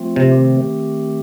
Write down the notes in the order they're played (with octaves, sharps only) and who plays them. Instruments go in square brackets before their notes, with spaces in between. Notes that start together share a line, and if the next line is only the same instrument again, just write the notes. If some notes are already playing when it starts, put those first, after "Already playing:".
Already playing: [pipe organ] F3 A3 C4 F4
[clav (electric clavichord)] C3
[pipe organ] D#3 A3 C4 G4